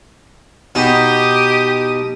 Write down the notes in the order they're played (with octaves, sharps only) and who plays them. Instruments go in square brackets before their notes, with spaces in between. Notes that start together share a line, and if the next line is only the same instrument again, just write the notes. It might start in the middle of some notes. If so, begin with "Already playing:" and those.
[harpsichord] B2 D#4 [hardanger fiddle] G4 D#6